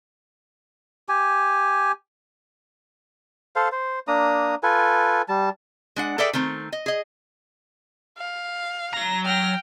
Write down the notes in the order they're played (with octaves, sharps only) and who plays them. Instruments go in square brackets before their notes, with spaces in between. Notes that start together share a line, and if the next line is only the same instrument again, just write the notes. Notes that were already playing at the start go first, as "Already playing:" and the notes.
[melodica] G4 G#5
A4 C5 F5
C5
A#3 D4 A#5 D#6
F4 A4 B4 G#5
G3 A5
[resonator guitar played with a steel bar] G#3 D4 F#5
G#4 A4 B4 D5 E5 G5
D#3 A3 C4 A#5
D#5
G#4 D#5
[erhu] F5
[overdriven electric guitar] F#3 A#5 [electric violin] A#6
[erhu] G5 [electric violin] F6 A#6